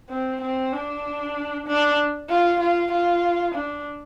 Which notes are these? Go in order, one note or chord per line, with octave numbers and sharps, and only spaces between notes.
C4
C4
D4
D4
F4
F4
F4
D4